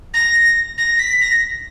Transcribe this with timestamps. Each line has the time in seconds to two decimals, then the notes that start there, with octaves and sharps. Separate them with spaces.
0.13 A#6
0.78 A#6
0.96 A#6
0.99 B6
1.21 A#6